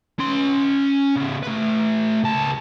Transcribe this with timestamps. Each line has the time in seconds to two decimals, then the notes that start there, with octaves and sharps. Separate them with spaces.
0.19 C#4 C6
1.16 C#3 B3
1.43 A3 B4
2.24 C#2 A5